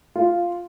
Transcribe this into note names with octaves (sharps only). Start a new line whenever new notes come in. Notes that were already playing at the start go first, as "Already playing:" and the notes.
F4